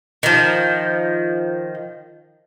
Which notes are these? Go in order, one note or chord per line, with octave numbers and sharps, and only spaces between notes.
D#3 F3